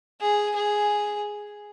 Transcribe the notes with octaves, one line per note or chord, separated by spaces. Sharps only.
G#4
G#4